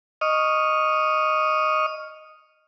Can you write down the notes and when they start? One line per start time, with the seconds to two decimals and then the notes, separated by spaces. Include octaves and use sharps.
0.21 D#5 C#6 D#6 F6